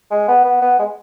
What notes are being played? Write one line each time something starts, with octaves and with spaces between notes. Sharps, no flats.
G#3
B3
B3
B3
G#3